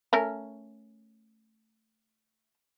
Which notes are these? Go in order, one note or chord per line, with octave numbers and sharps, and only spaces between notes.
A3 C#4 A#4